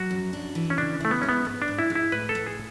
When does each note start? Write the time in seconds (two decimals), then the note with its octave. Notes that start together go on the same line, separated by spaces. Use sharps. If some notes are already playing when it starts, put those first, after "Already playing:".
Already playing: F#3 F#4
0.11 F#2
0.33 D4
0.55 E3
0.70 C#4
0.78 C#3 D4
1.00 A3 E4
1.11 B3
1.21 G#3 C#4
1.29 B3
1.45 G#2
1.62 D4
1.68 G#2
1.79 E4
1.90 G#3
1.95 E4
2.12 A2 B4
2.29 A4
2.35 A2
2.46 G#4